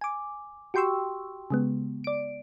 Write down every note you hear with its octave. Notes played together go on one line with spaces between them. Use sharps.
G#5 D6
F#4 G4 G5 C6 C#6 E6
C#3 G#3 B3
D5 D7